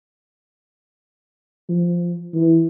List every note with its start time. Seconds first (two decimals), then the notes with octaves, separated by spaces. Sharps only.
1.69 F3
2.34 E3